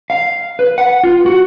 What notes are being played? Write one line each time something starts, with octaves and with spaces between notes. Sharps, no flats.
F5
B4
F#5
F4
F#4